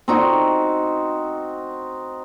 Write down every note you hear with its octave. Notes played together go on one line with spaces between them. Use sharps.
C4 D#4 F#4